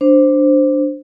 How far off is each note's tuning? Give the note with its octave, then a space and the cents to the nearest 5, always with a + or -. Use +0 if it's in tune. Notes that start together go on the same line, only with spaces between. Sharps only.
D4 +0 C5 +0